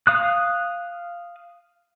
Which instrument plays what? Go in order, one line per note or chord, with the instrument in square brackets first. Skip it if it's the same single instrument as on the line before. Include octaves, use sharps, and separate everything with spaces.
[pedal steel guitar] F5 D#6 F#6